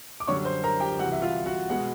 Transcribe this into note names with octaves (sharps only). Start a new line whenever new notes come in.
D6
F#2 D3 G3 C#5 C#6
C5 C6
A#4 A#5
G4 G5
C2 C3 E3 F#4 F#5
E5
F4 F5
F#4 F#5
B2 G#3 B3 F#4 F#5